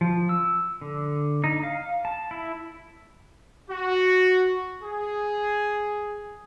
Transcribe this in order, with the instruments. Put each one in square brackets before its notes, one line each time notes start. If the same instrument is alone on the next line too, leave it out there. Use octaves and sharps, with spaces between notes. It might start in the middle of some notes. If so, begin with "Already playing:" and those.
[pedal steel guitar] F3
E6
D3
D#4
F5
A5
E4
[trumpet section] F#4
G#4